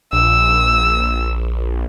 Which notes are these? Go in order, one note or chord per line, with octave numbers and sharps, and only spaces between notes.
A#1 E6